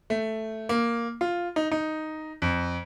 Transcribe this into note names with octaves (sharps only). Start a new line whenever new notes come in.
A3
A#3
F4
D#4
D#4
F2